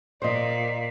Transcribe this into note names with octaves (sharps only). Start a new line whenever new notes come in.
A#2 C5 D5 D#5